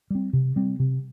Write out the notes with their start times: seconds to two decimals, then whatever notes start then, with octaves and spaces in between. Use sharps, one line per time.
0.10 G3 C4
0.33 C3
0.56 G3 C4
0.80 C3